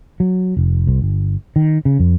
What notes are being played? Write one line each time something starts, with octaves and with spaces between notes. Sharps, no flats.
F#3
F1
C2
G1
D#3
C#3
F2